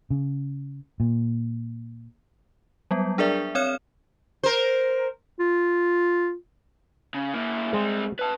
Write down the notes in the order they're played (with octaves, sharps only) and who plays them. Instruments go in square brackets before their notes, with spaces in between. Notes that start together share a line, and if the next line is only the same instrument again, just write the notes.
[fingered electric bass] C#3
A#2
[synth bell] F#3 G3 B3
D4 G#4 A#4 D5 E5
C4 C#5 F6 E7
[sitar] A#4 C5
[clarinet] F4
[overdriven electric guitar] C#3
A#3 E4
[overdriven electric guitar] G3 C4 [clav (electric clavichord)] G#3
[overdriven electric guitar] B4 A5